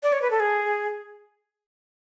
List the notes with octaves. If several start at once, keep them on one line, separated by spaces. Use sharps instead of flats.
D5
C#5
B4
A4
G#4